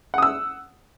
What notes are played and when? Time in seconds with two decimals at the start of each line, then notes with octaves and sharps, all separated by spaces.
0.14 F#5
0.18 D#6
0.23 E6